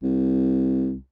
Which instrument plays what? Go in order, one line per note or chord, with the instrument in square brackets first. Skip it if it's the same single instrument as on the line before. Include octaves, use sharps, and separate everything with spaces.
[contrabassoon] C2